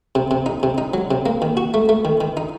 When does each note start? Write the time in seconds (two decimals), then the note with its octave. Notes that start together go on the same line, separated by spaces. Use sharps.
0.15 C3
0.31 C3
0.46 D#4
0.63 C3
0.78 D#4
0.94 F#3
1.11 C3
1.26 A#3
1.42 D#3
1.57 F#4
1.74 A3
1.89 A3
2.05 D#3
2.21 D#3
2.37 D#4